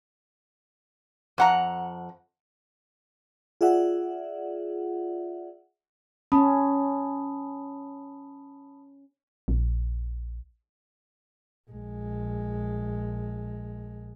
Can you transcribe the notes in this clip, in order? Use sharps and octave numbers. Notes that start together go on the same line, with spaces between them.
F2 F#5 A#5
F4 G#4 D5 E5 F#5
C#4 A5 B5 D#6
A#1
A#1 G#3